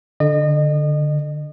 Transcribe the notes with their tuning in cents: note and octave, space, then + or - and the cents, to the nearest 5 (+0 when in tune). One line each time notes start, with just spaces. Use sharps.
D3 +0 D#5 -35